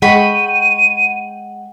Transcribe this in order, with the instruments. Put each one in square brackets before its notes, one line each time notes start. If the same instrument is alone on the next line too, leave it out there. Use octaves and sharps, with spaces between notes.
[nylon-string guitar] G#3 [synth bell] F#5 [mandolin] G5 B5 C#6 [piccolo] D#7